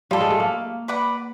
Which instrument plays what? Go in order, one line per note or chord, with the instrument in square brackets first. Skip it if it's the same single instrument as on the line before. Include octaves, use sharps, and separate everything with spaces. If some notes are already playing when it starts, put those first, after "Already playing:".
[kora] G3 [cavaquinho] F4 A4 D5
[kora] G#3
A3
A#3
[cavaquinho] B4 D5 F#5 B5